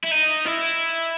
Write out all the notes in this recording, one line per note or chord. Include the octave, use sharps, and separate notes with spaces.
E4
D#4
E4